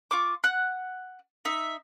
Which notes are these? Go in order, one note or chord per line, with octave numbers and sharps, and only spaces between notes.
F4 C#6 D6
F#5 F#6
D#4 E5